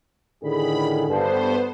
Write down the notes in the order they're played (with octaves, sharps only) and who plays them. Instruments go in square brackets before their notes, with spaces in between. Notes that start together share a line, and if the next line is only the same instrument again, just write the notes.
[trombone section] A2 D#3 G#4 [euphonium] D3 [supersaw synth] B5
[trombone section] G2 [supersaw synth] B3 C5 [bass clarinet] A4